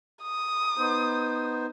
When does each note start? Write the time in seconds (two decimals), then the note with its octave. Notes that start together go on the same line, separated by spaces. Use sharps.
0.22 D#6
0.78 B3 D#4 C5